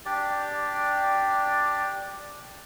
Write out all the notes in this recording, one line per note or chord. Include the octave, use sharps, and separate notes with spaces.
D4 G4 D5